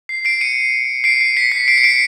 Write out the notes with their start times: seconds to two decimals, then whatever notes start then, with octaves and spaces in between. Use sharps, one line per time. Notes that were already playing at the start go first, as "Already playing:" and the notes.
0.09 C7
0.25 C7 D7
0.41 C#7 D#7
1.04 C7 D7
1.21 C7
1.37 B6 C#7
1.52 C7
1.68 C7 D7
1.78 C#7
1.84 C7 D7